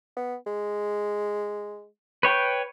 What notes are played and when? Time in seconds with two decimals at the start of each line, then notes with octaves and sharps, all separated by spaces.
0.17 B3
0.47 G#3
2.23 B4 C#5 G5